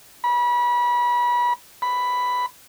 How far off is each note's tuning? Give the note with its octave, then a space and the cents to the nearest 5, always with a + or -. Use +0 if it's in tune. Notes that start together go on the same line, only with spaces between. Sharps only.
B5 -30
B5 +5